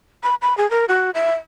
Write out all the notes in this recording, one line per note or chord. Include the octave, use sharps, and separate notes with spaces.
B5
B5
G#4
A#4
F#4
E5